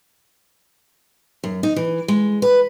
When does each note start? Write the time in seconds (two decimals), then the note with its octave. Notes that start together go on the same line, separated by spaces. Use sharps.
1.44 F#2
1.63 D#4
1.76 E3
2.08 G#3
2.42 B4